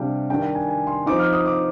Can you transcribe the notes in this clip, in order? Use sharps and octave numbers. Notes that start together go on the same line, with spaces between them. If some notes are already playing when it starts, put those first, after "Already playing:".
Already playing: C3 G3 D4 F5 G5
D#3 G3 D4 G5
G5
G#5
G#5
C6
F3 C4 D#4 D6
F6
D#6
D6